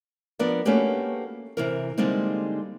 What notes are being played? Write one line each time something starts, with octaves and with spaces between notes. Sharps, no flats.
F3 B3 D4 A#4 D5
A3 A#3 C#4 F#4 G4 B4
C3 E3 A#4
D3 G3 G#3 A#3 C4 D#4